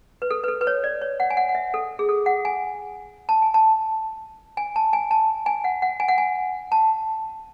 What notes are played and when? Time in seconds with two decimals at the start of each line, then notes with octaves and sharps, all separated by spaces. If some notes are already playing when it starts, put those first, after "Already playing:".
0.22 B4
0.31 A4
0.43 B4
0.48 A4
0.61 B4
0.67 C#5
0.84 D5
1.01 C#5
1.20 F#5
1.30 G#5
1.37 F#5
1.49 F#5
1.55 E5
1.74 A4
1.99 G#4
2.09 A4
2.26 F#5
2.45 G#5
3.29 A5
3.42 G#5
3.54 A5
4.57 G#5
4.76 A5
4.93 G#5
5.11 A5
5.46 G#5
5.64 F#5
5.82 F#5
6.00 G#5
6.08 F#5
6.18 G#5
6.72 A5